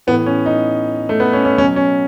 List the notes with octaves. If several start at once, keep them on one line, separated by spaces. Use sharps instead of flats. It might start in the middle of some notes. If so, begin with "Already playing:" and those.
A2 E3 B3
C#4
D#4
A3
B3
C#4
C#4
B2 F#3 C#4
C#4